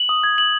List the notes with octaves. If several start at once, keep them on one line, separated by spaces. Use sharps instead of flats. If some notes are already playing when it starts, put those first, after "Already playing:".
Already playing: F#7
D#6
G#6
F#7